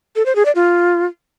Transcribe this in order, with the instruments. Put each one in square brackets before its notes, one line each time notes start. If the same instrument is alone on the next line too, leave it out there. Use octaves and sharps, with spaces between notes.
[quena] A4
C5
G#4
D5
F4